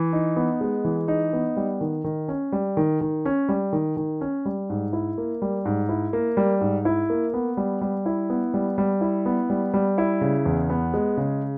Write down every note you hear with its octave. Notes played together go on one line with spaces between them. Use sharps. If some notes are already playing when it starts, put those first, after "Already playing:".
Already playing: E3
D#4
B3
G#3
E3
D#4
B3
G3
D#3
D#3
C#4
G3
D#3
D#3
C#4
G3
D#3
D#3
C#4
G3
G#2
E4
A#3
G3
G#2
E4
A#3
G3
G#2
E4
A#3
B3
G3
G3
E4
B3
G3
G3
E4
B3
G3
G3
E4
C#3
E2
B3
G#3
C#3